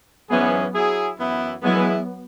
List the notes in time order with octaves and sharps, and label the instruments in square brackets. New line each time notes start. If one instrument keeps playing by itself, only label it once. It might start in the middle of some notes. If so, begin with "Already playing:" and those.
[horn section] G#2 E3 C#4 G#4 [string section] F#3 B3
[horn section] F#3 E4 G#4
F#2 E3 B3 E4
[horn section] E3 G#3 E4 G#4 [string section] F#3 B3